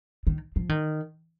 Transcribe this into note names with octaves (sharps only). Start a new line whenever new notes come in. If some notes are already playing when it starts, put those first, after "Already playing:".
D#3
F3
D#3